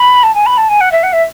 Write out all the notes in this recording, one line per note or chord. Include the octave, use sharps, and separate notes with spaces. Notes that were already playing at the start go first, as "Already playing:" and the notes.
Already playing: B5
A5
G#5
B5
A5
G#5
F#5
E5
F#5
E5